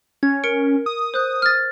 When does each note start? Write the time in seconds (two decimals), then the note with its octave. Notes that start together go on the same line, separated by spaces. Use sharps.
0.23 C#4 G#6
0.44 A#4 C#7 D7
0.86 D#6
1.14 C5 F#6
1.42 F6 A6